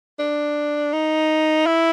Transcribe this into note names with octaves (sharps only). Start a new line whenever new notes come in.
D4
D#4
E4